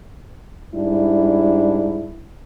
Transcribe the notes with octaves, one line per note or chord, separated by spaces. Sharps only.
G#2 G3 D4 E4